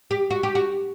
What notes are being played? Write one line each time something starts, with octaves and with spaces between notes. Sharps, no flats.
G4
F#4
G4
F#4